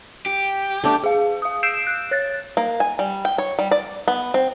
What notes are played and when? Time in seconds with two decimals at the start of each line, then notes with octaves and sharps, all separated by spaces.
0.26 G4
0.84 A3 D4
1.04 G#4 F5
1.42 F5 D#6
1.63 E6 G6 C7 D7 E7
1.87 F#6
2.11 C#5 F#6 A6
2.57 A#3
2.80 G#5
2.99 G3
3.25 G5
3.38 C#5
3.59 G3
3.71 D5
4.08 B3
4.34 C4